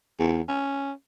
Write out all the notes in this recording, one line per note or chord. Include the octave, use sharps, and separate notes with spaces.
E2
C#4